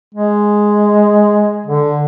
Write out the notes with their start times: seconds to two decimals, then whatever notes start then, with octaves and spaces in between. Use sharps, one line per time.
0.14 G#3
1.66 D3